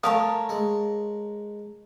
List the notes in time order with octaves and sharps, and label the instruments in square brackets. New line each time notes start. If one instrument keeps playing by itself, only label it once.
[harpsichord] A3 [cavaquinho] A#4 C#5 A5 [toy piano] F5 D#6
[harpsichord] G#3